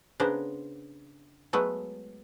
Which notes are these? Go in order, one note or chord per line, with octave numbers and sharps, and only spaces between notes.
C#3 B3 D4 A#4 C5
F#3 G#3 A3 B3